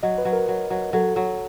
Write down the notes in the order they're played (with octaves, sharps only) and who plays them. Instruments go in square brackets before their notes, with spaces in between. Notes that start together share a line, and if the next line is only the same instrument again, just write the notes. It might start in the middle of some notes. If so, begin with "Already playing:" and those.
[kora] F#3 [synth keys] D#5
[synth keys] B4
[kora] F#3
[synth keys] A#4
[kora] F#3
F#3
[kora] F#3 [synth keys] A4
[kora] F#3